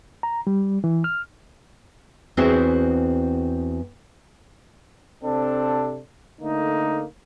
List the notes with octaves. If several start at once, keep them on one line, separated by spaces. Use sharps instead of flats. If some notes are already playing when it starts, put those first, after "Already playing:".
A#5
G3
E3
F6
E2 C4 E4 F#4 G#4 C5
C3 C4 D4 A4
D3 A3 A#3 D#4